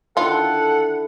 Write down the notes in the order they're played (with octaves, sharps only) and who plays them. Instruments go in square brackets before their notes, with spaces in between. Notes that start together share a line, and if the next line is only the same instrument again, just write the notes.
[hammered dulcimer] D3 E4 [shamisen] D#3 F4 [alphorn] A4 [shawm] F#5